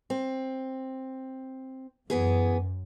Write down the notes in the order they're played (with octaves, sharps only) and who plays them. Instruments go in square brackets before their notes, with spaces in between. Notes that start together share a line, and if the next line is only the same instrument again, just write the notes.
[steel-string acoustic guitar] C4
[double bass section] F#2 [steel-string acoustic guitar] E3 B3 G#4